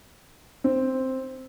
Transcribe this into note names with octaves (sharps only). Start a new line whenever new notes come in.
C4